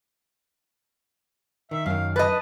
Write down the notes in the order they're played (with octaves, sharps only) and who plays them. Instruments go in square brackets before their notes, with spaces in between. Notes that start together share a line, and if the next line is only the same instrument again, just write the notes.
[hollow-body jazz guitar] D#3 [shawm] E5
[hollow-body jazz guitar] F#2 D#3 [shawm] F5
[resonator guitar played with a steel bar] B4 D#5 [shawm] A5